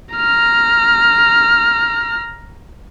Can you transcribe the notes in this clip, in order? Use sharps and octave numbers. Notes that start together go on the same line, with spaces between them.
A#5 F6